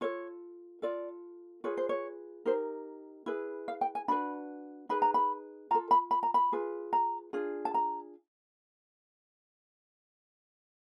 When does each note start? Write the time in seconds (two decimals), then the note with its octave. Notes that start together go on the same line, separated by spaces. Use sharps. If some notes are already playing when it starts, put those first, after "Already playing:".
0.01 F4 A4 C#5
0.82 F4 A4 D5
1.64 F4 G#4 B4 C#5
1.77 C5
1.89 C#5
2.45 D#4 G4 A#4 C5
3.26 E4 G#4 B4
3.68 F5
3.81 G5
3.95 G#5
4.08 D4 F#4 B4 B5
4.89 D#4 G#4 B4 B5
5.02 A#5
5.14 B5
5.71 F4 A#5
5.75 A4
5.91 B5
6.11 B5
6.23 A#5
6.34 B5
6.52 F4 G#4 B4
6.93 A#5
7.33 D4 F4 G#4
7.65 A5
7.74 A#5